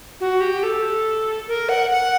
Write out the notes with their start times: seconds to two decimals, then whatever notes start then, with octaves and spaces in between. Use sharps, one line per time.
0.21 F#4
0.41 G4
0.63 A4
1.48 A#4
1.69 F#5
1.91 F#5